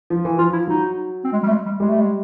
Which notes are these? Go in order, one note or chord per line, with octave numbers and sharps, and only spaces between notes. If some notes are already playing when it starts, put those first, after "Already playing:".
F3
E3
F3 F4
E4
F#3 D#4
C4
G#3
G3
A3
G#3
G3
G3 G#3
A3
G#3